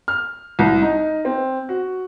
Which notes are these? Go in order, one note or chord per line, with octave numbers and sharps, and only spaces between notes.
F6
C2
D#4
C4
F#4